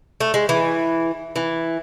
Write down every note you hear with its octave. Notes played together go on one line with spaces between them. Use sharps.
A3
G#3
E3
E3